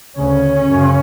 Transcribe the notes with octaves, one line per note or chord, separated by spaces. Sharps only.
D2 C#3 C#4
F#2 C#3